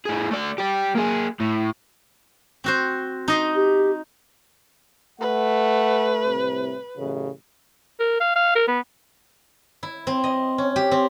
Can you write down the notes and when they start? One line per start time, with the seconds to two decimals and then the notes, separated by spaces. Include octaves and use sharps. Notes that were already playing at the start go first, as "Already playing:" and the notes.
0.06 A2 G#4
0.31 A3 D5
0.58 G4 D5
0.95 A#3 G#4
1.40 A2
2.64 C4 F#4 C5
3.28 D#4 D#5 C6
3.55 G4
5.20 A3 B4 F#5
6.26 C2 A2 C3
6.98 A1 F#2 C#3
8.00 A#4
8.20 F5
8.36 F5
8.55 A#4
8.68 B3
9.83 E4
10.07 C4
10.24 D#5
10.58 C#4
10.76 G4
10.91 C4